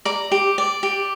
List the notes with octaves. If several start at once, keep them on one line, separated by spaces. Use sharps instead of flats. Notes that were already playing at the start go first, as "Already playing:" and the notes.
D5 A#5
G4
D5
G4